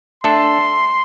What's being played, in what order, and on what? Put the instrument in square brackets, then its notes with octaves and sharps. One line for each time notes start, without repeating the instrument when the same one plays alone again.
[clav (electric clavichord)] A3 D4 A4 [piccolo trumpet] C6